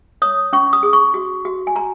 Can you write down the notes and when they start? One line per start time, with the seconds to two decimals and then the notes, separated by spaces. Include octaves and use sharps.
0.22 C#5 D#6
0.53 C#4 C#6
0.73 D#6
0.83 G#4
0.93 C#6
1.14 F#4
1.45 F#4
1.67 G#5
1.75 F#4 A#5